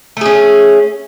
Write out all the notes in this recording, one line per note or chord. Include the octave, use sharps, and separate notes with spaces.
A3 C#4 G#4